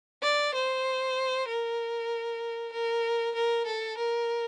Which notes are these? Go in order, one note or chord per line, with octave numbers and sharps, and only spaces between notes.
D5
C5
A#4
A#4
A#4
A4
A#4